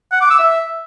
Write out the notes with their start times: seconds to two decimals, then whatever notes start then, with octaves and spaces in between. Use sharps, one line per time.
0.12 F#5
0.21 D6
0.30 E6
0.39 E5